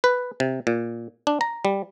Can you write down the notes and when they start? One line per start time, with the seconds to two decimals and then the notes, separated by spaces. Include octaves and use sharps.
0.04 B4
0.40 C3
0.67 A#2
1.27 D4
1.41 A#5
1.65 G3